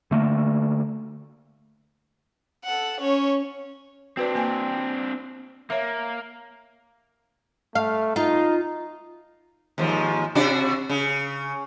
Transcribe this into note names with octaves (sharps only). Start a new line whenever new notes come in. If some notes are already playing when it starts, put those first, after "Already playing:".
D3 A3 A#3
A4 F#5
C#4 C#5
C4 D4 F#4 B4 D5
A#3 G5 G#5
A#3 C#5 E5
A3 F5
D#4 F4
D#2 G#2 F3
C3 D4 F#4
C#3